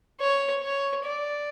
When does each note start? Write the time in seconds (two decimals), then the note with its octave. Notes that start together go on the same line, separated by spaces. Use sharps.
0.21 C#5
0.63 C#5
1.05 D5